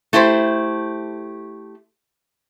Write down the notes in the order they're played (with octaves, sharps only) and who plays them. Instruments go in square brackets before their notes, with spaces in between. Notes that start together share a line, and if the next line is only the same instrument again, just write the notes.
[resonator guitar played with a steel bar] A3 E4 G4 C5